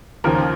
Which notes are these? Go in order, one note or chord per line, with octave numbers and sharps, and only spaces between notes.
D#2 C#3 F3 A#4